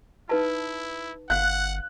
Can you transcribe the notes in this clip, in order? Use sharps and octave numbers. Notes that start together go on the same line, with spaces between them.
D#4 E4 B4 A5
G1 F5 F#5 F#6